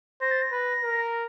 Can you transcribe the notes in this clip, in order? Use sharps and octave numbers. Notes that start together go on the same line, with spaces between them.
C5 A#6
A6
A#6
B4
A#4